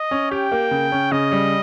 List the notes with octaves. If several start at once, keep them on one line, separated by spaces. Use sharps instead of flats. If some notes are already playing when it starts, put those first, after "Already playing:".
Already playing: D#5
C#4
G4 G5
A#3
C#3
C#4
C#3 D#5
G3